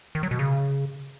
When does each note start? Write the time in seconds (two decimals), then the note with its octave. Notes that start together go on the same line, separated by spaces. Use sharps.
0.15 D#3
0.23 F#3
0.31 B2
0.39 C#3